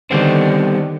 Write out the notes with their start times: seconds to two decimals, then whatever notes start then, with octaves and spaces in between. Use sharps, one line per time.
0.11 D3 D#3 G3 B3 C4